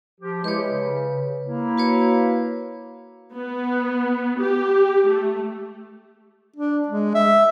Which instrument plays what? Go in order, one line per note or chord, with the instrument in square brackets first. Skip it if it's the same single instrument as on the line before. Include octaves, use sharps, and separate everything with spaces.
[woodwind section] F3 G4
[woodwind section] G#3 E4 G4 [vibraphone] B4 C#5
[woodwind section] C#3
A#3 E4
[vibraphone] F#4 B4 C#5
[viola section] B3
G4
A3
[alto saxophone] D4
G#3
E5